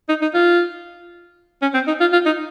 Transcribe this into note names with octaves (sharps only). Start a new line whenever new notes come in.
D#4
D#4
F4
C#4
C4
D#4
F4
F4
D#4